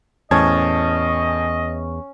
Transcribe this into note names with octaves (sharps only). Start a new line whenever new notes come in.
E2 A2 C#4 D#5 A5 G#6